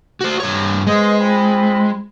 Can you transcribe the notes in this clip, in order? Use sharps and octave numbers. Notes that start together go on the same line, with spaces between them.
F#4 C5
G2 C#5
G#3 B3 C5 D#5
C4 F4 B5